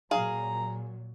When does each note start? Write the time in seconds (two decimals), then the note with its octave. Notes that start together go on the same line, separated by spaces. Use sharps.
0.11 A#2 F#3 G#4 F5 A#5